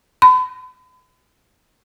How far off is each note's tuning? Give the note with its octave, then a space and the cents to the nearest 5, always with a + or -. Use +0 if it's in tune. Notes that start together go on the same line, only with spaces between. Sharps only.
B5 +40